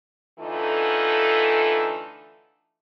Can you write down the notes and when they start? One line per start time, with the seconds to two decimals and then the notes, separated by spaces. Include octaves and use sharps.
0.38 D3 E3 A3 D#4 F4 A4